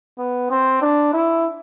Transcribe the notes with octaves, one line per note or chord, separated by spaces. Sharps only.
B3
C4
D4
E4